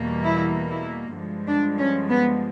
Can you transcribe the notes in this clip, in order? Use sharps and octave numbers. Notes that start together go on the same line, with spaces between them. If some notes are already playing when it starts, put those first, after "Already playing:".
Already playing: E2 B2 G3 A#3
E4
E4
G2 D3 F3 G#3
D4
C#4
B3